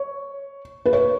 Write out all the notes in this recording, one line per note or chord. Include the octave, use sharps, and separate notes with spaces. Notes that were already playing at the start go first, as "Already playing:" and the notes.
Already playing: C#5
B4
C#5